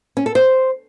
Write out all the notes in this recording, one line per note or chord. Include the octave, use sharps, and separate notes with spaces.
C#4
A4
C5